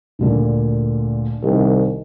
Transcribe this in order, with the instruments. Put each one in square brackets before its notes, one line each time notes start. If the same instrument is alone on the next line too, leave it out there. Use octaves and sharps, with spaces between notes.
[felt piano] D2 A#2 D3
[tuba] C2 [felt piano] D#3